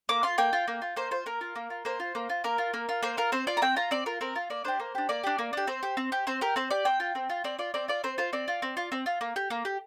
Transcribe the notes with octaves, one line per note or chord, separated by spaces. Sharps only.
A#3 D6
F4 C6
A#3 G5
F4
A#3
F4
A#3 C5
F4 C5
A#3 A#4
F4
A#3
F4
A#3 C5
F4
A#3
F4
A#3 A#4
F4
A#3
F4
A#3 C5
F4 A#4
C4 C5
F4 D5
A#5
C4 G5
F4 A#5
C4 D5
F4 A#4
C4 A#4
F4
A#3 D5
D4 G4 C5
A#3
D4 G4
A#3 D5
D4 G4
A#3
D4 G4
C4 C5
G4
C4
G4
C4 C5
G4 A#4
C4 C5
G4 D5
C4 G5
F4
C4
F4
C4 D5
F4 D5
C4 D5
F4 D5
C4 C5
F4 C5
C4 D5
F4
C4
F4
C4
F4
A#3
G4
A#3
G4